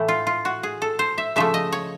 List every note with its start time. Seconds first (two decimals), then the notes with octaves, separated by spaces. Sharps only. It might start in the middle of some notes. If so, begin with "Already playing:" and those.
Already playing: A2 E3 A3
0.08 F4
0.27 F4
0.45 F#4
0.63 G#4
0.82 A4
0.99 C5
1.18 E5
1.36 C#3 F3 A3 E5
1.54 D#5
1.72 C#5